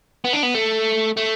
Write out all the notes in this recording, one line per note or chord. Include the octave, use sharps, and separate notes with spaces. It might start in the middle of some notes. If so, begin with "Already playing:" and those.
B3
D4
B3
A3
A3